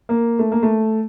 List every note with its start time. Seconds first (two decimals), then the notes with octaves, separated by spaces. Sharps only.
0.09 A#3
0.39 A3
0.52 A#3
0.63 A3